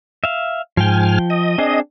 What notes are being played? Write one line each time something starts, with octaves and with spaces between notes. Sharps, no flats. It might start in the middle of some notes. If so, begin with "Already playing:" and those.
E5 F5
G#2 F3 G5 G#5 F6
D#5
C4 D4 G#4